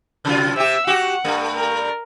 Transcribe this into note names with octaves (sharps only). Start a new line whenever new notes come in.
C3 F#3 F4
C3 G4 E5 E6
F#4 G4 F#5
G2 A3
A#4